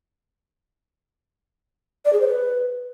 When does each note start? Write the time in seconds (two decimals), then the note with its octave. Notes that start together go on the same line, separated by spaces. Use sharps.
2.05 D5
2.13 G#4
2.20 C5
2.28 B4